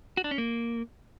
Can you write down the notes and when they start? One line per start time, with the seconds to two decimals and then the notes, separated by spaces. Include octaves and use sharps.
0.17 F#4
0.24 D4
0.31 C#4
0.38 A#3